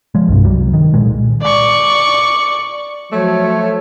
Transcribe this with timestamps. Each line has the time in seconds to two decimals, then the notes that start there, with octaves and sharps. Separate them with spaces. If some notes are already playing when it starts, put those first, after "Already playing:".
0.15 F3 G#3
0.28 B1 G2 C3
0.44 C2 F#3 G3
0.74 D#3
0.94 A#2 G#3
1.42 D5 C#6
3.12 F3 F#3 A3 C#5